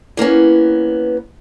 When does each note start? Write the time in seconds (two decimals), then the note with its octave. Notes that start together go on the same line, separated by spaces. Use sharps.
0.17 E3 A#3 B3 C#4